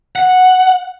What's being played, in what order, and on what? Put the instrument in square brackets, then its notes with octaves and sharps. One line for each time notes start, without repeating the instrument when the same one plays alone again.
[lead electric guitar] F#5